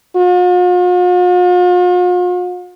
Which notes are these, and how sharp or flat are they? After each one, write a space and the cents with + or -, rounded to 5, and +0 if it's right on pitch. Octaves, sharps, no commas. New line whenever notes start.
F4 +45